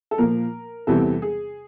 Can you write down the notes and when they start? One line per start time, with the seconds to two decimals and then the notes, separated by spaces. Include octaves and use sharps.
0.11 A4
0.18 A#2 F3 A#3 A#4
0.87 E2 C3 E3 G3 C4 A4
1.22 G#4